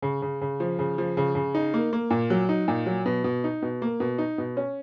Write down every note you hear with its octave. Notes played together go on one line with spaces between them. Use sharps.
C#3
C#3
C#3
F3
C#3
F3
C#3
C#3
D#4
A#3
A#3
A#2
F#3
D#4
A#2
F#3
B2
B2
D#4
B2
A#3
B2
D#4
B2
C#4